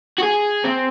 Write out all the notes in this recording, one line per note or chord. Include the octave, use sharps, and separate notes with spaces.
F#4
G#4
C4